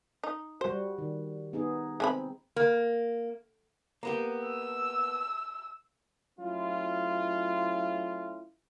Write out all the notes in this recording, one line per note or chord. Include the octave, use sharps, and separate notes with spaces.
D#4
G3 F#4 C5
D#3
B3 D#4 G#4
G#3 C4 G#5 B5
A#3
A#3 B3 G4
E6
F#3 A3 C#4 E4 F4